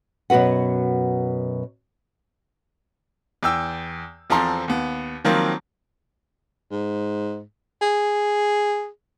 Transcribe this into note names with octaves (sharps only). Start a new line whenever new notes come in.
F#2 B2 F#4 B4 F#5
E2 G5 E6
E2 F3 C4 A4 A#5 C6
D#2 B3
D#3 F3 F#3 A#3 C4
G#2
G#4